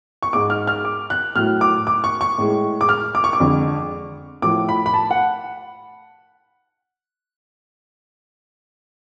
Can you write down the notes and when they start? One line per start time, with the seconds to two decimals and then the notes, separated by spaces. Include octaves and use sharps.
0.22 C#6
0.33 G#2 G#3 D6
0.50 F6
0.67 F6
0.85 D6
1.10 F#6
1.35 A2 F#3 A3 F6
1.61 D6
1.87 D6
2.04 C#6
2.21 C#6
2.38 A2 G#3
2.81 D6
2.89 F6
3.15 D6
3.24 C#6
3.33 D6
3.40 F2 D3 G#3
4.42 A2 F3 A3 D6
4.69 B5
4.86 B5
4.94 A5
5.10 F#5